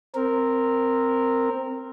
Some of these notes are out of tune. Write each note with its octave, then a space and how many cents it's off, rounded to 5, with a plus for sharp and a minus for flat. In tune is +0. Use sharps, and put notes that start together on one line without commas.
C4 +0 A#4 -10